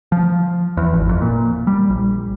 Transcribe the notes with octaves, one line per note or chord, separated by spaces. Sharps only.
F3
E2
G#1
F2
A#2
G3
A#1